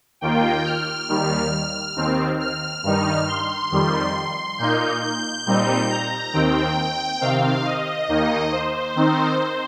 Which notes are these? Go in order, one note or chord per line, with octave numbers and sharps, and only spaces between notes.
D#2 D#3 A#3 F4 G5
F6
D#2 D#3 G3
D#2 D#3 C4
F6
G2 D#3 G3 D#4
C6
F2 D#3 G3
A#2 A#3 D#4 G6
G6
A#2 G3 C4 D#4
A#5
D#2 D#3 C4 G5
C3 D#3 C4 F5
D#5
D#2 D#3 A#3 D#4
C5
D#3 C4 D#4